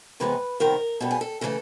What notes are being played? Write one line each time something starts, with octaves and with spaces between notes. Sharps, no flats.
C3 E3 G#3 B3 B4
C3 D#3 G3 B3 A#4
B2 G3 B3 A4
G#4
A4
C#3 E3 A3 A4